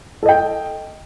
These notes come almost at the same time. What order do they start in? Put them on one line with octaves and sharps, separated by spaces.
A4 D#5 G5